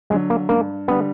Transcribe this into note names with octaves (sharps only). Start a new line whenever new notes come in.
D3 F#3 G#3
A#3
G2 A#3
D3 G3 B3